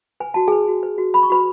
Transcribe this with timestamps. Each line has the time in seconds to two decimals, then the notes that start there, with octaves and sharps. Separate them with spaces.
0.20 B4 G#5
0.34 F#4 A5
0.48 G#4 B4 G#5
0.68 F#4
0.83 B4
0.98 F#4
1.14 B4 B5
1.23 C#6
1.30 F#4 B4 B5